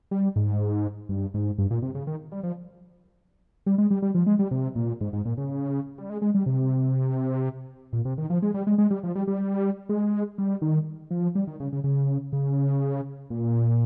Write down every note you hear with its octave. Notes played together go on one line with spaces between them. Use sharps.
G3
G#2
G2
G#2
G2
A#2
C3
C#3
D#3
G3
F3
G3
G#3
G3
G3
F3
G#3
G3
C3
A#2
G#2
G#2
A#2
C#3
G3
G#3
G#3
G3
C3
A#2
C3
D#3
F3
G#3
G3
G#3
G#3
G3
F3
G3
G3
G#3
G3
D#3
F3
G3
D#3
C#3
C#3
C#3
C#3
A#2